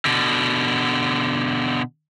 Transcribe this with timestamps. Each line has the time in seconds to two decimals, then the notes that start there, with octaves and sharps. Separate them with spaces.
0.05 B2 D3